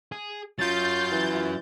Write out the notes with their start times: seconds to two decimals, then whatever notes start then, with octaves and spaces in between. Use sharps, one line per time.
0.12 G#4
0.59 F#3 C#4 F4 G6 A6
1.12 E3